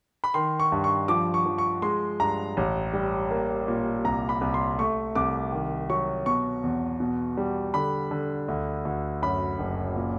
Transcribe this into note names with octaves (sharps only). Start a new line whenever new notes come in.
B5
D#3 C6
C#6
G2
C#6
F3 D6
C#6
F3
C#6
G#3 C6
G2 A#5
A1
G3
A#3
A#2
C2 A#5
B5
C2
C6
A3 C#6
C2 D6
D#3
F#3 C#6
B2 C#6
E2
B2
G3
D3 B5
D3
D2
D2
F#2 B5
F#1
A#2